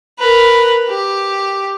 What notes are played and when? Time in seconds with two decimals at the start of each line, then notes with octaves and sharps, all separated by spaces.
0.19 A#4 B4
0.89 G4